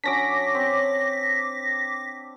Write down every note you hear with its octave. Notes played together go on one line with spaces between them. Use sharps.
F#3 C#4 D4 D6 A#6 B6
C4